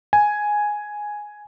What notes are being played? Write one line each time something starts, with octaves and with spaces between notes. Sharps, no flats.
G#5